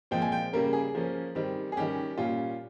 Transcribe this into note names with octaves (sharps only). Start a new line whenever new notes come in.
A#2 F3 G#3 C4 G5
G#5
G5
C#3 G3 A#3 C#4 A#4
G#4
F3 A#3 C#4
D#3 G3 C4
G#4
D#3 G3 C#4 G4
A#2 G3 C#4 F4